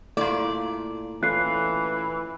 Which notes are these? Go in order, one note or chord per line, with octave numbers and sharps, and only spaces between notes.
A#2 A3 E4 F4 D5
E3 A3 C#4 F4 F#6 C7